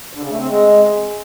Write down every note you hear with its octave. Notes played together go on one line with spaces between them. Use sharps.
D3
C#3
A3
C4
G#3